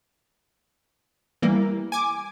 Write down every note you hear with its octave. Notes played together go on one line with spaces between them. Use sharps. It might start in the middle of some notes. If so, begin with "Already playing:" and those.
E3 G3 A#3
G#5 D6